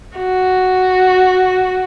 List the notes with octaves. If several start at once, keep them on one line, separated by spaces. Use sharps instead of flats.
F#4